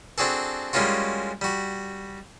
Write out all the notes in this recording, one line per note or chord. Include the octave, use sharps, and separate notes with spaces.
C4 D4 F#4 G#4 A4
G3 G#3 A#3 C#4 F4 F#4
G3 F#4